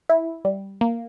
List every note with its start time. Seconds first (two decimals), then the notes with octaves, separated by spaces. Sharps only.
0.09 E4
0.45 G3
0.81 A#3